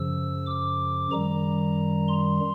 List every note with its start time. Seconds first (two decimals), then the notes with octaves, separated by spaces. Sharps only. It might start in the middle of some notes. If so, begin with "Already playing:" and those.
Already playing: F#2 C#3 F3 E6
0.46 D6
1.11 F#2 D#3 G3 A#5
2.08 C6